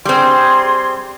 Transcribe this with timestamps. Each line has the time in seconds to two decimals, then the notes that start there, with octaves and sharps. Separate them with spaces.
0.05 G3 C4 G#4 C6